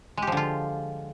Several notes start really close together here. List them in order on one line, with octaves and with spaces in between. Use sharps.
G#3 G4 F3 D3 F4